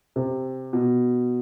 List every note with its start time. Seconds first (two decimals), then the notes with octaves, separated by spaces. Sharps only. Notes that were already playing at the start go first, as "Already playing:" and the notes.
0.16 C3
0.73 B2